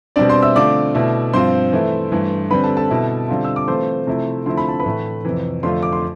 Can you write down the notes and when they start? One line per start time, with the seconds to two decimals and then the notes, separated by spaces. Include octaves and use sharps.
0.16 B2 G3 C4 D4 D5
0.29 C5 C6
0.42 E5 E6
0.56 D3 A3 C4 F4 D5 D6
0.95 B2 A3 E4
1.33 G2 F3 C4 F4 C5 C6
1.73 E3 A3 E4
2.12 G2 E3 A3
2.50 D3 G3 C4 B4 B5
2.63 A4 A5
2.77 A4 A5
2.90 B2 B3 E4
3.28 D3 G3 C4 F4
3.44 E6
3.56 D6
3.68 E3 A3 C4 F4 C5 C6
4.07 C3 F3 A3 E4
4.46 D3 F3 A3 C4 E4 C6
4.57 B5
4.68 A5
4.80 B4 B5
4.85 A2 E3 A3
5.25 F2 C3 E3
5.63 F2 D3 A3 D4 F4 C5 C6
5.82 D6
5.93 C6